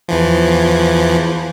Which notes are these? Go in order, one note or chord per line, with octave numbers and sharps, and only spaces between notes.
E2 E3 F3